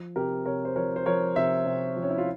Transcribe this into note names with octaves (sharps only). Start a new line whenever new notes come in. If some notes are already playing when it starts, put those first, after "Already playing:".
Already playing: F3
C3 G4 A#4
C3 A#4 C#5
C5
F3 A#4 C#5
C5
F3 A#4 C#5
C3 C5 E5
C3
F3
C#4
E4
F4